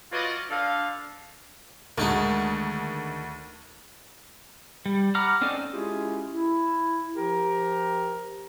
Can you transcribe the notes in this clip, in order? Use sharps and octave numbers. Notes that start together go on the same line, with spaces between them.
F#3 F4 F#4 B4 D5 D#5
D3 D4 A4 F5
D2 D#3 G#3 A3 D#4 F#4
G3
F#5 A#5 B5 D6 F6
C4 C#4 D#4 A4 D5
G#3 C#4 E4 F4 G4 G#4
E4
F3 G4 A#4 A#5